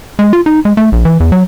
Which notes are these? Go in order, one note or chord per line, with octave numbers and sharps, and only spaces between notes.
G#3
F4
D#4
G#3
A3
A#1
E3
E2
F#3